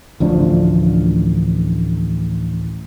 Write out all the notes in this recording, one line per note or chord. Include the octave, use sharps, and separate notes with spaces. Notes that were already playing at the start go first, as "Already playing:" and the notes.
A1 D2 F3 D4